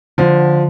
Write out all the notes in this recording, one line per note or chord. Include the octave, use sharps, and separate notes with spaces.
D3 F3